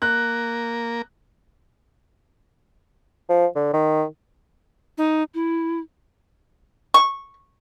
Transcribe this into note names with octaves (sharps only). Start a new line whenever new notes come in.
A#3 F#6
F3
D3
D#3
D#4
E4
C#6